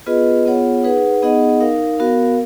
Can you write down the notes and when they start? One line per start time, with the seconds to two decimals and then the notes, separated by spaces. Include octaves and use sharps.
0.06 B3 F4 G#4 B4 D#5
0.45 B3 F4 G#4 C#5 F#5
0.84 D#4 G#4 B4 F#5
1.22 B3 D#4 G#4 D#5 F#5
1.61 D#4 A#4 F5
1.98 B3 F#4 A#4 F5